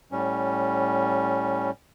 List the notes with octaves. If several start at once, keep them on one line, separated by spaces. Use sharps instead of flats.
A2 G3 C#4